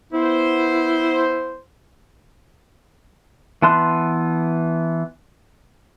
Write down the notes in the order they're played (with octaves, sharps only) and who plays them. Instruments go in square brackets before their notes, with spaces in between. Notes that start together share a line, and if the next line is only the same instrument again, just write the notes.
[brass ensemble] B3 C5 [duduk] E4
[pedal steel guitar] E3 B3 A5 C6 F#6